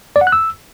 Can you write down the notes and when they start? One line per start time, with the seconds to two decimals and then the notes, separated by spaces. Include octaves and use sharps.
0.16 D5
0.21 F#5
0.27 F#6
0.32 E6